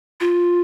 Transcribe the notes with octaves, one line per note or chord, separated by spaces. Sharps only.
F4